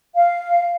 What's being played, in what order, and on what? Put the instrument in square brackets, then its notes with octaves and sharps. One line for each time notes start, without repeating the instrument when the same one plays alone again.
[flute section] F5